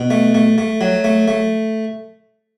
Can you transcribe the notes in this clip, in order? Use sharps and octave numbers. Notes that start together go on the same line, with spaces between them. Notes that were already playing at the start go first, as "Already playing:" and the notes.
Already playing: B2
A3
A3
A3
F#3
A3
A3